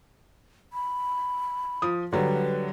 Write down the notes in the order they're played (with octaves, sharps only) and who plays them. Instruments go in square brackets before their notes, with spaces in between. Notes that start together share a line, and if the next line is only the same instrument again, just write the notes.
[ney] B5
[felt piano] F3 D#6
[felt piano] D3 F#3 G3 [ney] B4